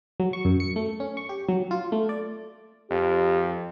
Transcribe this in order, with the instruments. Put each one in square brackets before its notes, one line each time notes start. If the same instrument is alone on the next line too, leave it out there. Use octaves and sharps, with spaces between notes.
[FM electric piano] F#3
C#6
F#2
C#7
A3
C#4
C#6
G4
F#3
F4
A3
D5
[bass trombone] F2 [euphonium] G4